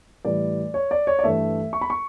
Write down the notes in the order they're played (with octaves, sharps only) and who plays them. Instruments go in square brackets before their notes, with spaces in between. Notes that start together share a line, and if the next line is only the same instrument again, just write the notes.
[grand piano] A2 E3 G3 D5
C#5
D5
C#5
D5
G2 E3 A3 E5
C#6
B5
C#6